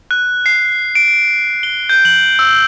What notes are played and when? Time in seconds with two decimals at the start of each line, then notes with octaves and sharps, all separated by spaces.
0.11 F#6
0.46 C7
0.95 D7
1.63 G7
1.89 G6
2.05 F#7
2.39 E6